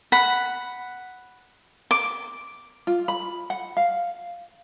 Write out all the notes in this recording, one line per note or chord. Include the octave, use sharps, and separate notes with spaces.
F#5 B5
D6
F4
B5
F#5
F5